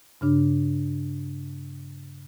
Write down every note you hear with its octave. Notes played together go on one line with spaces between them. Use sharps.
G2 C#3 D4